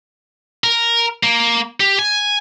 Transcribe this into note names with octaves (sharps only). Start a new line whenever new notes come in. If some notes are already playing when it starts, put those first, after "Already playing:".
A#4
A#3
G4
G#5